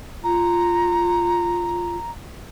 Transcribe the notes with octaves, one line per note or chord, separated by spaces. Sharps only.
F4 A#5